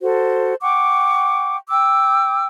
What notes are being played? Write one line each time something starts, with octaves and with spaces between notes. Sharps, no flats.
F#4 A4 C5
F#5 G5 C#6 D6
G5 D6 E6